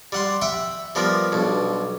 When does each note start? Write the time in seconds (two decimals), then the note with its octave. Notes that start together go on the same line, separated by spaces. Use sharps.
0.12 G3 F#5 C6
0.42 E5 F#5 G5 B5
0.95 F3 G3 B3 A#4
1.32 B1 G2